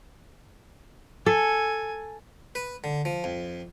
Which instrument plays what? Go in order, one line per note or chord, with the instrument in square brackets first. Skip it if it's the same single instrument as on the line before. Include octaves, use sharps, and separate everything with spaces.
[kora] A4 [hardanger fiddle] G#5
[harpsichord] B4
D3
F3
F2